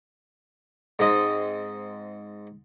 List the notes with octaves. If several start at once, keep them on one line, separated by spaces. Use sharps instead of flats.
G#2 C4 D#5